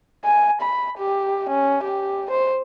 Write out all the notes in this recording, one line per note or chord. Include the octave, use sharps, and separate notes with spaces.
G#5
B5
G4
C#4
G4
C5